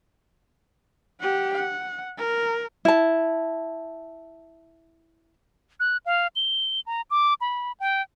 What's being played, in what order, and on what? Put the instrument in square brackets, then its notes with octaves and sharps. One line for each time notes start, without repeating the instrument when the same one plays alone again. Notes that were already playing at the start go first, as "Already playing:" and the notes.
[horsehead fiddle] G4 F#5
F#5
A#4
[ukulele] E4 A5
[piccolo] F#6
F5
G7
A#5
D6
B5
G5